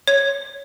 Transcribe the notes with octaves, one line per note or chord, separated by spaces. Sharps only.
C#5